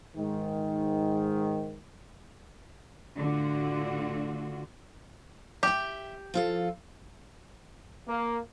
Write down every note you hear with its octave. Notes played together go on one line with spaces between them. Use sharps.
G#2 D#3
A2 D3 F4 F#4
G4 E5 G5
F3 F4 A4
A#3